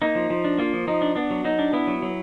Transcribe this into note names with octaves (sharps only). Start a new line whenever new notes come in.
A#3 D#4
F3
F3
D4
A#3 F4
F3
F3 D#4
D4
B3 D4
F#3
F#3 D#4
D4
B3 E4
F#3
F#3